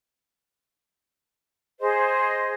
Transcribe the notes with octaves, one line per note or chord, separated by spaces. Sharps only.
G#4 C5 D#5